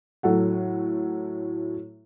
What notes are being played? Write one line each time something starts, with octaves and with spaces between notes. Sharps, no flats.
A2 F#3 A4 F#5